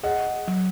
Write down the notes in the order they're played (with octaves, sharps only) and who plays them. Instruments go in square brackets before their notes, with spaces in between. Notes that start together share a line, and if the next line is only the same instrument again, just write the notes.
[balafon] G#4 [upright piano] D#5 F#5
[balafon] F#3